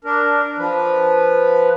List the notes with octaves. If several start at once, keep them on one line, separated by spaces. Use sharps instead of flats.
D4 A#4
F3 B4